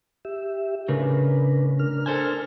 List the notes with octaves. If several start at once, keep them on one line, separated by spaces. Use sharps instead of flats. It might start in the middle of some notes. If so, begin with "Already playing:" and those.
G4 E5
A2 C#3 D4 A#4 B4
D4 A#4 F6
A4 C5 G#5